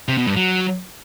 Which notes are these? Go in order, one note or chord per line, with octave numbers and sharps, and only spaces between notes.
C3
B2
G2
F#3